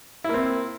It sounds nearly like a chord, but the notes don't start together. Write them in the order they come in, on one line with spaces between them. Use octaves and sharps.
E4 A#3 C4